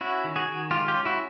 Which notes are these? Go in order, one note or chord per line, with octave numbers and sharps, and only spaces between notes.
C#4 E4 F#4
D#3
F#4 G#4
D#3
G#3 F4 G4
F4 G4
C#4
E4 F#4